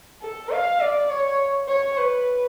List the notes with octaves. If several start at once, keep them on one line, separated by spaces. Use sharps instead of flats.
A4
F5
D5
C#5
C#5
B4